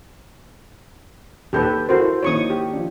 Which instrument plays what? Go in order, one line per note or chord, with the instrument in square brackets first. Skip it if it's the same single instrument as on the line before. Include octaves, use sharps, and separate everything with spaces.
[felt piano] D#2 E6 G6 [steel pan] G4 A4 B4
[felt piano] E4 A4 A#4 [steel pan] F#4 C5
[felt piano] D#3 A#3 E4 [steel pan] C#5 C#6 D#6
[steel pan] G4
[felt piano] F3 D4